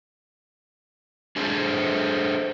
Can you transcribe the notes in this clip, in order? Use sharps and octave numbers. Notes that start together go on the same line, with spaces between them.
D4 G#4 A4 C5